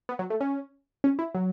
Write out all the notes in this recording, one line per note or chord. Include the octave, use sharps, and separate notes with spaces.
B3
F#3
A3
C#4
C#4
E4
F#3